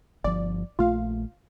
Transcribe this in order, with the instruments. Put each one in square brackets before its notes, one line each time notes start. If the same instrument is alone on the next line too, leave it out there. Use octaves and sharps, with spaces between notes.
[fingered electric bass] G1 F3 [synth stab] D5
[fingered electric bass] A#1 A3 [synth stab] F4 F5